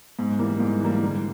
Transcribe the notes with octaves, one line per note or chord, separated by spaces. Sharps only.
G#2
E3 G3 A#3
G#2
E3 G3 A#3
D3